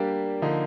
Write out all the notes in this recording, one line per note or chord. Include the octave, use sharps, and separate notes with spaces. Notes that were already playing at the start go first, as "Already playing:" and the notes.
Already playing: G3 A#3 D4 G4
D3 F3 A#3 D#4